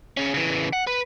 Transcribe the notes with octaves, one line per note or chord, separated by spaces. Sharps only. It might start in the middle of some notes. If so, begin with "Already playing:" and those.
C#3 C#4
C#3 E3
F#5
B4